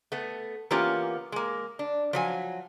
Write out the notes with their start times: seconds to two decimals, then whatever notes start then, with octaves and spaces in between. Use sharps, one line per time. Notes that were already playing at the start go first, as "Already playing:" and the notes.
0.12 A3 B3
0.71 E3 A#3 B3 C#4 F4 G4
1.32 G#3 A#3
1.79 D4
2.13 F3 F#3 G#5